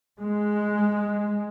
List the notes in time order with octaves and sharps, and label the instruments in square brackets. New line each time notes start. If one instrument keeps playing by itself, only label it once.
[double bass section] G#3